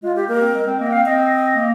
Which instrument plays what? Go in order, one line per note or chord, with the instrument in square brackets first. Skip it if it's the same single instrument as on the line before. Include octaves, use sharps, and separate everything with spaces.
[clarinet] G#3 [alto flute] F4
[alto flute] G4
[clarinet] A#3 [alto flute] A#4
[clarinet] C4
G#3
C4
[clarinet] A#3 [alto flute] D#5
[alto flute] G5
[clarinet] C4 [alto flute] F5
[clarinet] C4 [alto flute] D#5
[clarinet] A#3